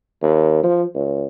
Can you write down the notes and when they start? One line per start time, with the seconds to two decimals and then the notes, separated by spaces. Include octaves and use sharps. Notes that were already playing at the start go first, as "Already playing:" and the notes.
0.22 D#2
0.63 F3
0.95 C#2